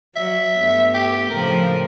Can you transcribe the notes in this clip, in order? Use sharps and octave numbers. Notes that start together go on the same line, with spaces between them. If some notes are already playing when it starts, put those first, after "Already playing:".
F#3 E5
G2 A3 B3
G4
A2 C#3 F3 A#4